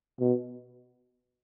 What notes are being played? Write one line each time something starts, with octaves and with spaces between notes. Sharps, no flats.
B2